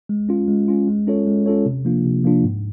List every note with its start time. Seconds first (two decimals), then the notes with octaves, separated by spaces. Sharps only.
0.09 G#3
0.29 C#4 F4
0.48 G#3
0.68 C#4 F4
0.87 G#3
1.07 C#4 F4 A4 C#5
1.27 G#3
1.46 C#4 F4 A4 C#5
1.66 C3
1.85 F3 A#3 D4 F4
2.05 C3
2.24 F3 A#3 D4 F4
2.44 G#2